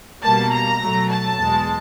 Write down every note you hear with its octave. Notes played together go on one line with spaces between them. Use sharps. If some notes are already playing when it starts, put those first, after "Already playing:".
B2 G3 A#3 A5
A#5
B2 F#3 A3
A5
E2 B2 G#3